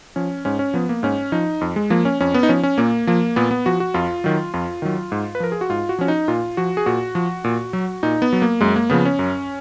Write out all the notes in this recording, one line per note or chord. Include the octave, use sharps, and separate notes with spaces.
F3 C#4
G#2 C#4
C#4
F3 B3
A#3
G#2 C#4
F3 D#4
F2
G#3
F3 A#3
C#4
F2 C#4
B3
D#4
F3 C#4
C#4
A#2 A#3
F3 A#3
A#2 B3
B3
F3 F#4
F#4
F2 F4
D#3 F#3
F2 F4
D#3 F#3
G#2
B4
F3 A#4
G#4
F#4
G#2 F4
F#4
F3 C#4
D#4
A#2 F4
F3 F#4
G#4
A#2 F#4
F3
A#2
F#3
A#2 D#4
B3
F#3
A#3
F#2 G#3
A#3
C#3 F3 B3
C#4
F#2